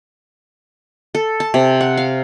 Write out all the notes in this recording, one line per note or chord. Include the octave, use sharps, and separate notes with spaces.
A4
A5
C3
F#5
F5